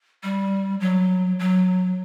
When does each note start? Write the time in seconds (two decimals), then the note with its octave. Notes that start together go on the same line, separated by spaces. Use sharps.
0.23 G3
0.80 F#3
1.39 F#3